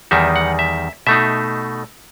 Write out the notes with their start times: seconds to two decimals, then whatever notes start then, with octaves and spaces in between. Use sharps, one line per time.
0.11 E2 D#3 G3 D#4 E5
0.36 F#5
0.59 E5
1.07 B2 A3 D#4 E5